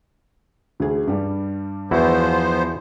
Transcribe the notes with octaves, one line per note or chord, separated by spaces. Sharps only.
D2 G#4
G2 G3
E2 F3 B3 E4 F#4 C5